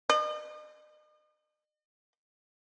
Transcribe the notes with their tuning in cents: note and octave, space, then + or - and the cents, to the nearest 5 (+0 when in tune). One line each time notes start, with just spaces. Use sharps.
D#5 -40